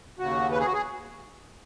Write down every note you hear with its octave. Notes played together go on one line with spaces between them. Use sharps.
D#2 C#3 F#4
B4
G#4
F#4
G#4